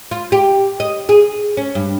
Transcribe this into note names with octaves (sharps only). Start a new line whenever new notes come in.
F4
G4
D#5
G#4
C#4
G2